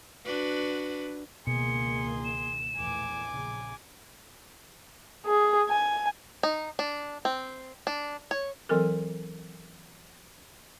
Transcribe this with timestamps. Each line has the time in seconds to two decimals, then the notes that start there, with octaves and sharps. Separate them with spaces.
0.25 D4 F#4 B4
1.47 C#2 B2 D#3 A#3 G#4 C6 C#7
2.25 E7
2.77 A#1 E2 A2 G#5 D6
3.27 A#1 C#3
5.26 G#4
5.69 G#5
6.43 D#4
6.79 D4
7.25 C4
7.87 D4
8.31 C#5
8.69 E3 F#3 C4 A4 A#4